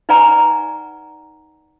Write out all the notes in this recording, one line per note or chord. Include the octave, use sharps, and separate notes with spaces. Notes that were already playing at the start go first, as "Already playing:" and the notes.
D#4 B4 D5 F#5 G#5 A#5